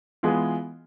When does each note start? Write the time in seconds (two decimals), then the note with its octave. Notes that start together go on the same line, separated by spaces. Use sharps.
0.23 E3 G#3 B3 F4 G#4